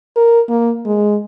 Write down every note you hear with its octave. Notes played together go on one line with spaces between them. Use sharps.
A#4
A#3
G#3